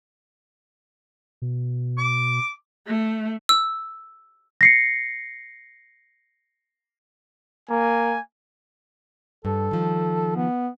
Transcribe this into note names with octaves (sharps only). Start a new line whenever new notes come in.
B2
D6
A3
E6
A#6 C7 C#7
A#3 G#5
G2 A4
D#3 F3
B3